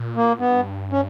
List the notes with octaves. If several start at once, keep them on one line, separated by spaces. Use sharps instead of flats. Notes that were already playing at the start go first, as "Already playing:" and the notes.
Already playing: A#2
A#3
G2 B3
C#4